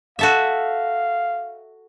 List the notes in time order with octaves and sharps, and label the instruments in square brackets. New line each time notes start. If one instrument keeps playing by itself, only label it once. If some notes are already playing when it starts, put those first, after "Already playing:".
[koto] F#4 A4 E5 [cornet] F5